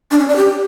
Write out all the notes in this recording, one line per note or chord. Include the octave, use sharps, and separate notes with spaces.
D4
C#4
D5
G4